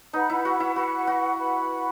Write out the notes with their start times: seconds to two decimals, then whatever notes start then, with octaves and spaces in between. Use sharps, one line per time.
0.13 D#4 B4 F#5 B5
0.30 E4
0.45 F#4
0.60 E4
0.75 F#4 B4 F#5 B5
1.07 F#4
1.38 B4 F#5 B5